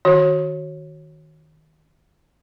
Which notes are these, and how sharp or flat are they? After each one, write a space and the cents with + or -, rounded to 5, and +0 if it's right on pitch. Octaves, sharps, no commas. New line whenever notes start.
D#3 +0 F#4 +0 C#5 -25